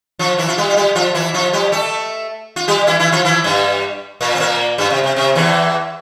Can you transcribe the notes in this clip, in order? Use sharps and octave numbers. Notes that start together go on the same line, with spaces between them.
F3 F4
E3 E4
F4
G3 G4
F4
G3 G4
F3 F4
E3 E4
F3 F4
G3 G4
A3 A4
F4
G3 G4
E3 E4
E3 E4
F3 F4
E3 E4
G2 G3
A#2 A#3
C4
A#2 A#3
G2 G3
C3
C3
C3
E2 E3